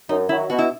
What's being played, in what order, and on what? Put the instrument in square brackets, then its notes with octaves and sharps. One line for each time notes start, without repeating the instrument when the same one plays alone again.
[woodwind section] F#2 [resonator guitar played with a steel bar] D#4
[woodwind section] D#3 [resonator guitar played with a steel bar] E4
[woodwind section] F#3
[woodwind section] B2 [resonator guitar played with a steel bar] F#4
[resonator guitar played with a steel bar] E4